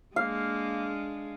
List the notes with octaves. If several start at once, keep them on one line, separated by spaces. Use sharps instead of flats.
G#3 A#3 D4 F5